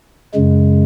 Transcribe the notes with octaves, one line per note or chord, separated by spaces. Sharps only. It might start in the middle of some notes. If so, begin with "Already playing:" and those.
F#2 C#3 G#3